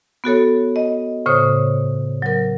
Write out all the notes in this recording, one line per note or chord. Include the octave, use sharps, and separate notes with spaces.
B3 F#4 A4 C#5
D#5
A2 C#3 C5 C#5 D#6
F#3 A#4